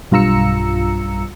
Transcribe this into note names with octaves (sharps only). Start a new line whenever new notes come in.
B1 G2 F4 A#5 E6 C#7